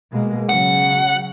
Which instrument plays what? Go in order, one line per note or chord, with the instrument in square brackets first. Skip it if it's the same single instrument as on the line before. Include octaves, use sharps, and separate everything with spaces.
[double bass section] B2 G#3 A#3
[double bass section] C#3 F#3 [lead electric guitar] F#5